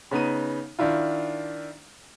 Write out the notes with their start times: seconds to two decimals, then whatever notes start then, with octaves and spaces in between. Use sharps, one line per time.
0.11 C#3 B3 D#4 D#7
0.79 D#3 D4 E4 F4